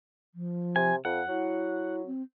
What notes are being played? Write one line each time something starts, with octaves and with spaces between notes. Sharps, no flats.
F3
C3 G#5
F2 F#5
F#3 E4
C4